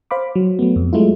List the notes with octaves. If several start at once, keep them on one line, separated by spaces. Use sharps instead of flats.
C5 F5 B5 D6
F#3
F#3 A3 B3
F2
F#3 G#3 A3 E4 F4